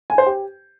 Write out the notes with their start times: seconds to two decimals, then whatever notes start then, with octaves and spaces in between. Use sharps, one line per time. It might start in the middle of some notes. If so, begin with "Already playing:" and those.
0.10 G#5
0.18 C5
0.26 G4